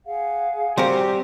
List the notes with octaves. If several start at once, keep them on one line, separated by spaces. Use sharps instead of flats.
G#4 F5 F#5
G3 C4 F#4 G4 A#4 C5